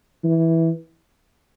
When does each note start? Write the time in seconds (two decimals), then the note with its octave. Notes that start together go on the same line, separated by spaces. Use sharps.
0.24 E3